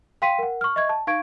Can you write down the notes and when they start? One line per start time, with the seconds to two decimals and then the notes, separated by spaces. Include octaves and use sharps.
0.22 F5 G5 C6 B6 D#7
0.39 A#4 F#5
0.61 C#6 F6
0.76 D#5 E5 C#6 G#6
0.89 A5
1.07 D#4 F5 C#6 G#6 D7